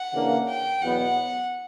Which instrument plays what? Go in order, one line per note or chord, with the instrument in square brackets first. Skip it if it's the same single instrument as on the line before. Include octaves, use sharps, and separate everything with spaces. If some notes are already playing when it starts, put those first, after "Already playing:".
Already playing: [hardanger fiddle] F#5
[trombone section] C#3 E3 A#3 D4
[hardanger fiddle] G5
[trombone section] E2 B2 F#3 B3 F#4 [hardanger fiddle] F#5